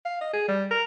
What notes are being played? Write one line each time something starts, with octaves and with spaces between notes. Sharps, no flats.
F5
D#5
G#4
G3
A#4